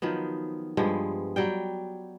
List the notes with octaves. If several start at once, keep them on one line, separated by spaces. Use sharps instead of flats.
D#3 F3 F#3 B3
G2 F3 G#3 B3
F#3 G3 G5